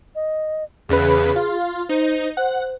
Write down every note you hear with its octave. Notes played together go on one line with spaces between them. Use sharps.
D#5
E2 C#3 G#4 B4
F4
D#4 C5
C5 F#5